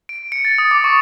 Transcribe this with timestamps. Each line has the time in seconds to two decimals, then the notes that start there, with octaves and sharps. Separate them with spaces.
0.09 D7
0.32 C#7
0.45 A6
0.58 D#6
0.71 D6
0.84 C#6